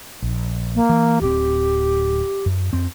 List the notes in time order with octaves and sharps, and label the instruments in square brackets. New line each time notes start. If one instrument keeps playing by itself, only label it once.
[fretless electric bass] A#1
[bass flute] A#3
[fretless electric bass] E3
[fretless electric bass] D1 C4 [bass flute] G4
[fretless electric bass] F#2
F2 C4